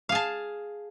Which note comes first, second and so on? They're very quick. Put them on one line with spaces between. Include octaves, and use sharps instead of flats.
F5 G#4 A5